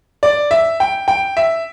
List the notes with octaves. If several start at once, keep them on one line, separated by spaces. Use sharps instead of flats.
D5
E5
G5
G5
E5